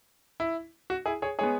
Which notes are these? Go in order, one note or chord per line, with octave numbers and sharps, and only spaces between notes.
E4
F#4
E4 G#4
G#4 C#5
G#3 B3 G#4 C#5